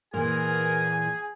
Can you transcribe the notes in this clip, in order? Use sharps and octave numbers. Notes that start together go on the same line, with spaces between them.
A#2 E3 G#4 A#4 G#5